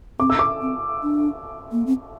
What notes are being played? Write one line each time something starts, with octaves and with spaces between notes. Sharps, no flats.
C4 D6
E6
D6
C4
D4
A#3
C4